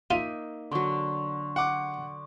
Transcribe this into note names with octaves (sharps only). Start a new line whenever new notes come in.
A#3 D#4 F4 E5 D#7
D3 F#3 C6 C#6
F#5 D6